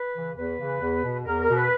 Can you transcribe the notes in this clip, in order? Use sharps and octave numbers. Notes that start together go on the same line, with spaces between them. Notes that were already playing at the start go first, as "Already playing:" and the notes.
Already playing: B4
C#3 E3
E2 B4
C#3 E3
E2
B2
E2 A#4
A#4
B2
B4